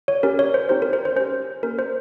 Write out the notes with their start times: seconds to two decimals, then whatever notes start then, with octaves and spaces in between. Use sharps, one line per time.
0.08 C#5
0.23 C#4 G4 A#4
0.39 C#5
0.54 C5
0.69 C4 D#4 G4 C5
0.82 A#4
0.93 C5
1.05 C5
1.16 C#4 G4 C5
1.63 A#3 C#4 G4 A#4
1.79 C5